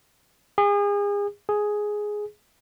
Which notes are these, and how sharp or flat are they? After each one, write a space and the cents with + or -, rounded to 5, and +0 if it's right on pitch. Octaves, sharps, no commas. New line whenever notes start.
G#4 -35
G#4 +5